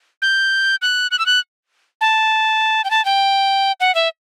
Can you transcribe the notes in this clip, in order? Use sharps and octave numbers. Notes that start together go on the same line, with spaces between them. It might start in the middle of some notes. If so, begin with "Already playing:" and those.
G6
F#6
F#6
E6
F#6
A5
G5
A5
G5
F#5
E5